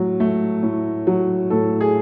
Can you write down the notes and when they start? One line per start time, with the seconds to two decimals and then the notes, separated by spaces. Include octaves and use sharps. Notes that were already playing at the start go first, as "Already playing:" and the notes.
Already playing: A2 F#3
0.20 A3
0.63 A2
1.07 F#3
1.50 A2 A4
1.81 G#4